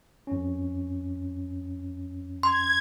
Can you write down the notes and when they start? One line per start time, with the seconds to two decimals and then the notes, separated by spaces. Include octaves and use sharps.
0.27 F2 C#4
2.43 C6 G#6